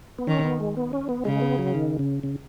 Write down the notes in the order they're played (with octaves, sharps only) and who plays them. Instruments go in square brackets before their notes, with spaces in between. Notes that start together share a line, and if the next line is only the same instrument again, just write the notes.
[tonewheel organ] B3
[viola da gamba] D#3 [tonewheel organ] C#4
[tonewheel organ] B3
G#3
B3
C#4
B3
[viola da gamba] C#3 [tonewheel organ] G#3
[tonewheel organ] B3
F#3
D#3
C#3
C#3